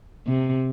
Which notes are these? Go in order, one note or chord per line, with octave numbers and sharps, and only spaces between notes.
C3